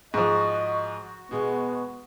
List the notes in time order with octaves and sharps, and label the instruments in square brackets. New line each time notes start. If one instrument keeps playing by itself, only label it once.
[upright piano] G#2 F3 [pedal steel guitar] F#4 [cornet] D#5
[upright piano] B2 G#3 [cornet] B3